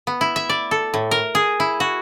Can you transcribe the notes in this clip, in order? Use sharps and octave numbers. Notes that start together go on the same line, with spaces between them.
B3
E4
E5
D5
A4
A2
A#4
G#4
E4
F#4